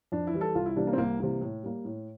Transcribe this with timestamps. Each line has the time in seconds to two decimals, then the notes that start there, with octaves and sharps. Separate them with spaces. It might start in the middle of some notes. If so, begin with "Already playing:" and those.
0.12 F2 D4
0.27 E4
0.34 E3 G3
0.41 A4
0.55 C2 F4
0.66 E4
0.76 C3 E3 G3 A#3 D4
0.87 A#3
0.93 C4
0.98 C2 A#3
1.20 C3 E3 G3 A#3
1.41 A2
1.63 G3 A#3
1.85 A2